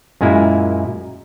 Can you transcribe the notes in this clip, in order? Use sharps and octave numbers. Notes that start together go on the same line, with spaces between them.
F#2 A#2 G#3 A#3 E4